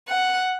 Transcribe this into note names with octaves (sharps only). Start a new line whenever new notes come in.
F#5